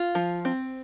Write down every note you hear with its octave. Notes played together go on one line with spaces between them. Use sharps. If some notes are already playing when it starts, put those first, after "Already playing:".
Already playing: F4
F3
C4